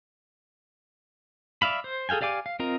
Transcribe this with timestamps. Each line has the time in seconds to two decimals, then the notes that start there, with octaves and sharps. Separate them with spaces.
1.62 D5 E5 F5 B5
1.84 C5
2.09 G#4 A4 F5 G5 G#5
2.21 G4 D5 F5 G#5 D6
2.46 F5
2.59 C4 F4 A#4 D#5 A#5